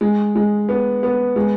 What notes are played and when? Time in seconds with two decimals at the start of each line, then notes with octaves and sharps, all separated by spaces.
0.01 G#3
0.36 G#3
0.69 B3
1.03 B3
1.36 G#3